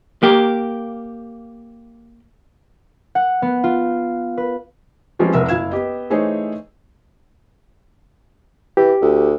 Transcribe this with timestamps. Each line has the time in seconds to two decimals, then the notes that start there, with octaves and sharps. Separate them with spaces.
0.23 A#3 G4
3.15 F#5
3.42 B3
3.64 F4
4.37 B4
5.19 E3 F3 G3 G#3 C4 C#4
5.33 F1 C2 A#4 B4 E5 E6
5.48 F#1 E4 F5 G#6 E7
5.72 B3 G4 D#5
6.10 E3 A3 D#4 G#4 C5 C#5
8.77 E3 G4
9.01 D2